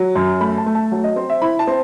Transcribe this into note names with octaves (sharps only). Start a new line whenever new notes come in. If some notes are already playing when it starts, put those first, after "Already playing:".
Already playing: F#3
F#2
A3 B5
A5
A3
A5
F#3
D#5
C4 C5
E5
E4 B5
A5
C4